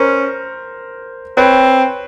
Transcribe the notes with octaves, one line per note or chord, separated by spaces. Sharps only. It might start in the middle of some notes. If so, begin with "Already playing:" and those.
Already playing: C#4 A#4 C5
C4 B4 C#5